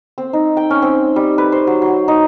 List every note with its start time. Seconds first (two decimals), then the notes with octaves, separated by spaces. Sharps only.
0.18 C4
0.33 D#4
0.57 G5
0.70 C#4
0.82 C4
1.16 G3
1.38 B4
1.52 C5
1.67 F#3
1.82 F#3
2.08 D#4